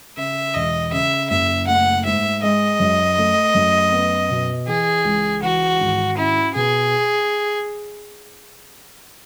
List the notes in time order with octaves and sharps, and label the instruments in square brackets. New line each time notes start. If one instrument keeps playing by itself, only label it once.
[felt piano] C#3 [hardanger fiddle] E5
[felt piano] E1 [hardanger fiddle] D#5
[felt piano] C#3 [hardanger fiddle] E5
[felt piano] F#1 [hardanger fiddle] E5
[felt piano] A3 [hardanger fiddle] F#5
[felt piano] G#2 [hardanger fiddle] E5
[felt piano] G#3 [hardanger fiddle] D#5
[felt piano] F#2
A3
F#2
B3
B2
[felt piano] E3 [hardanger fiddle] G#4
[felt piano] C#2
[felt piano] E3 [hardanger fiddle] F#4
[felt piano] G#1
[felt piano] C#4 [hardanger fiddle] E4
[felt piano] B2 [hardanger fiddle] G#4